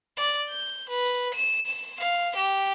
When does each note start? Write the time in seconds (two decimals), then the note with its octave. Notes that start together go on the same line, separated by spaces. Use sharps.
0.17 D5
0.49 G6
0.90 B4
1.34 E7
1.66 E7
2.00 F5
2.36 G4